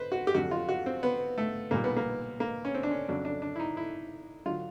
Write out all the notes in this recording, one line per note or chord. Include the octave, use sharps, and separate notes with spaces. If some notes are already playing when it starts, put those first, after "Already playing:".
Already playing: B4 C5
F#4
G4
F2 D3 F#3 F#4
F4
F#4
C4
B3
A3
B1 A#2 G3 A#3
B3
A#3
A#3
C#4
C4
D4
C#4
F2 C#3 F#3 D4
D4
D4
E4
D#4
E4
D3 F#3 F4